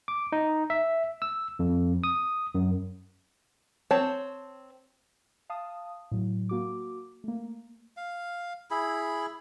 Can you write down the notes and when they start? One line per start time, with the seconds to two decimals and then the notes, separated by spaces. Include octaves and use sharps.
0.08 D6
0.32 D#4
0.70 E5
1.22 E6
1.59 F2
2.04 D#6
2.55 F#2
3.91 C4 C#5 A5
5.50 F5 A5 D#6
6.11 A2 F#3
6.49 A#3 F#4 D6
7.24 A3 A#3
7.97 F5
8.71 E4 G#4 B5